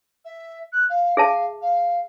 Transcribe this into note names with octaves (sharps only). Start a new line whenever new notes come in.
E5
F#6
F5
G#4 E5 F5 A5
F5